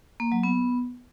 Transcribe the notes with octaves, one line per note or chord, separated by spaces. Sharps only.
A#3
F#3
B3